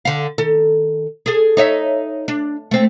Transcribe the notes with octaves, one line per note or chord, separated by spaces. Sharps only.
D3 F5
D#3 A4
G#4 A4
D#4 C#5 E5
D4
A3 C4